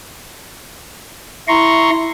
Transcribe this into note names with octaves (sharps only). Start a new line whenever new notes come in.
E4 A#5 C6 C#6